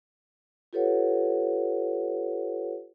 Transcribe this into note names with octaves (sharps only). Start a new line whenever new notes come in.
F4 G4 A4 B4 C#5 F#5